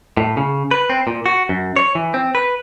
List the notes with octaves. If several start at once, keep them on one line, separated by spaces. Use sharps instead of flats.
A2
C#3
B4
C4
A#2
F#4
F#2
C#5
E3
C4
B4